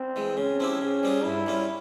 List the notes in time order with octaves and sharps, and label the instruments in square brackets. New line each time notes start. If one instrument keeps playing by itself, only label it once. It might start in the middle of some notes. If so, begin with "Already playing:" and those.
Already playing: [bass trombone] C4
[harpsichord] E3 G#3
[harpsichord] C#3 [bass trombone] C#4
[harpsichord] F3 C4 E4 G4
C#3
G3 C4 F4 G#4
[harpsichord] G2 [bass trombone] E4
[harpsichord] G3 C#4 F4